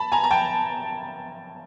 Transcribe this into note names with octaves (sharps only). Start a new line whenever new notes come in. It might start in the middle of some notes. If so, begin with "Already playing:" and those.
Already playing: A5 B5
G#5 A#5
A#5
G5 A5